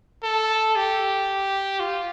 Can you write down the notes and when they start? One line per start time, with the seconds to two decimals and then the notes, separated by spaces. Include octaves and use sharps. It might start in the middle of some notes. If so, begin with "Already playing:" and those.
0.23 A4
0.76 G4
1.80 F4